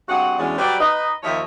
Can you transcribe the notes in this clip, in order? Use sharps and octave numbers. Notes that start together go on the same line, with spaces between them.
G2 C4 F#4 G#4 F#5
E2 D3 E3 F#3 G#3 C#4
F#3 G3 B4 C5 D5
D#4 B4 D#5
D#2 F3 C#5 D#5 E5